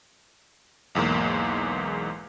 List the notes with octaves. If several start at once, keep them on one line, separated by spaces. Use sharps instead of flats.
B1 E2 G#2 A#3